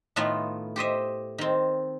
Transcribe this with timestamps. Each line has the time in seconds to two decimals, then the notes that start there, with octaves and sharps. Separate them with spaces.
0.16 A2 D#3 A3 B3 F4 E5
0.76 G4 C5 D#5 E5
1.38 D#3 C4